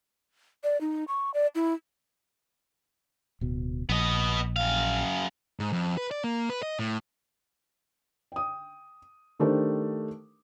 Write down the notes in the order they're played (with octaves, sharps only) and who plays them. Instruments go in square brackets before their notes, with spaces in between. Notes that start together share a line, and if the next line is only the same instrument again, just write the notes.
[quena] D5
D#4
C#6
D5
E4
[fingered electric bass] D1 B2
[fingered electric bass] A#1 [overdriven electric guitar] B3 D#5
[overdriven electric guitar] F#2 F5
[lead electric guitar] G#2
F2
B4
D5
A#3
B4
D#5
A2
[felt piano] G5 D#6
D#3 A3 D4 G4 A#4 C5